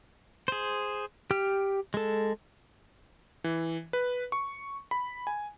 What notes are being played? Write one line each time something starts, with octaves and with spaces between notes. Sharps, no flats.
G#4 C5
G4 G5 F6
G#3 A4
E3
B4
C#6
B5
G#5